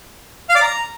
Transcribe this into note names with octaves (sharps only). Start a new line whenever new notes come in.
F5
D5
A#5